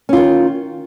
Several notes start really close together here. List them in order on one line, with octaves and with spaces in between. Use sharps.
C#4 F4 D#3